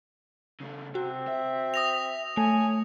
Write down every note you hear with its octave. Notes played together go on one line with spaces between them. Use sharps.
C#3 A3
C3 C4 F#4
E5
D#6 A#6 F7
A3 C#5 G#5